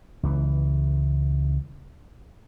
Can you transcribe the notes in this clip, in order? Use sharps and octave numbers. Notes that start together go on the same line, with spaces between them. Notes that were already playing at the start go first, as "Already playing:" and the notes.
C#2 E3